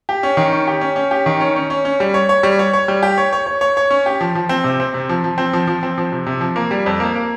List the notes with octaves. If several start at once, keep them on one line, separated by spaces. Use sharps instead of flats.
G4
C#4
D#3
C#4
G4
C#4
C#4
G4
D#3
C#4
C#4
C#4
C#4
G3
C#5
C#5
G3
C#5
C#5
G3
G4
C#5
C#5
C#5
C#5
C#5
C#4
G4
F3
F3
C4
C3
C4
C3
F3
F3
C4
F3
F3
C4
F3
C3
C3
F3
A#3
G3
F2
A#3
A#3